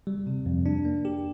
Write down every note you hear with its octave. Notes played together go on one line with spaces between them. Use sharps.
G3
C3
F2
D4
A#3
G4